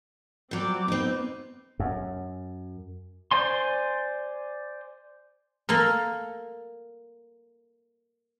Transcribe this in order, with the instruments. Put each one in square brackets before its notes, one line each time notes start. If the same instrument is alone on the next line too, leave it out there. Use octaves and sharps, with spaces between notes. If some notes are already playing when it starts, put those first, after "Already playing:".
[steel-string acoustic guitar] F#3 G3 [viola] C4 D6
[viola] B3 [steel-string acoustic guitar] C4 D#4
[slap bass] F#2
[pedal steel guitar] C5 D5 G#5 C6
[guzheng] A#3 A4 A#4